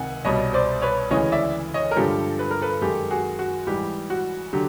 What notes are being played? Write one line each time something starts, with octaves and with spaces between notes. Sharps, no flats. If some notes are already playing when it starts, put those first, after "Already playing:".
Already playing: C#2 C3 D#3 F#5 G#5
C2 B2 G3 C#5 D#5
C5 D5
B4 C#5
D2 C#3 E3 G#3 C#5 D#5
D5 E5
C#5 D#5
A#4
G2 D3 F3 G#3 G4 A4
B4
A#4
A4 B4
F#2 D#3 G#3 G4 A4
F#4 G#4
F#4
G#2 E3 G3 G4
F#4
D3 F#3 G4